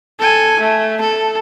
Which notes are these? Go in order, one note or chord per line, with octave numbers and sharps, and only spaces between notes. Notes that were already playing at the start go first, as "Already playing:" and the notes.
A4 G#5
A3
A4